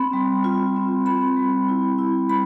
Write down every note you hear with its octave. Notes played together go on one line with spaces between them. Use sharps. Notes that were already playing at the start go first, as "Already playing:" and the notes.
Already playing: C4 B5
G3
F4
C4
C4 B5
G3
E4
E4
G3 B5